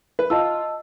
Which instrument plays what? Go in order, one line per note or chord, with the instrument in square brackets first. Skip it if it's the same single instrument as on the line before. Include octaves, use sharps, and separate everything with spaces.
[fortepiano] B4
[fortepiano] F4 [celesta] D#5 A5 E6